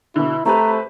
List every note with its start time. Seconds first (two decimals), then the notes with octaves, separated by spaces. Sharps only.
0.16 B2 D3 E4
0.46 A3 C4 G4 B4 A#5